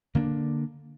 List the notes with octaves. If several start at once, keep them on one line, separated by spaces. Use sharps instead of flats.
D3 A#3 C4 D4